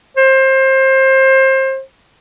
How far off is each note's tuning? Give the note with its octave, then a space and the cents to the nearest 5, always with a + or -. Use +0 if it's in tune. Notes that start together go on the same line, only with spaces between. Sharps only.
C5 +25